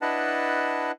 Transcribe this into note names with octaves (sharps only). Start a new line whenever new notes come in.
D4 E4 B4 D#5 F#5 A5